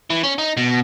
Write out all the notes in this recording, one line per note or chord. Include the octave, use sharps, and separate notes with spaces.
E3
C#4
D#4
B2